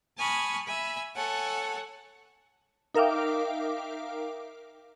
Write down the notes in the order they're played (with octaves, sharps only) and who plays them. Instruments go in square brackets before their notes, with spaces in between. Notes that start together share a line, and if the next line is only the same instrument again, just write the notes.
[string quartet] G#5 A5 B5 C#6 D#6 F6
E5 G#5 B5
A4 C#5 F#5 G#5 A5
[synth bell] D#4 A#4 E5 F5 G5 D6